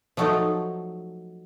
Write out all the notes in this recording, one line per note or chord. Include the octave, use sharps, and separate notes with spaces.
F3 F#3 A3 D#4 A4